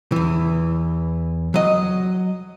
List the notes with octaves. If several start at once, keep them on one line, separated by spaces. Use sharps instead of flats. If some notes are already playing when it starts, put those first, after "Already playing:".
E2 E3
F#3 D#5